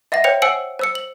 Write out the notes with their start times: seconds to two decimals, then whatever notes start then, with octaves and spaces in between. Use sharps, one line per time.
0.12 D#5 E5 F#5 A#6
0.24 C5 C#5 G5 C#7 F7
0.42 C5 F#5 G#5 E6 C#7 F#7
0.79 C5 E6 C#7
0.95 F#7